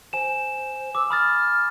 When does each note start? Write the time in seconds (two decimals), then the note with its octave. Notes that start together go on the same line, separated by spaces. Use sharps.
0.13 C5 G#5 E7
0.95 D6 E6
1.10 B5 D#6 F6 A6